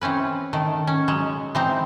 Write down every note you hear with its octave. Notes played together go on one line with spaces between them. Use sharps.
E3 C4 C#4 B4
D#3 A3
C#4
F#3 G#3
E3 C4 D#4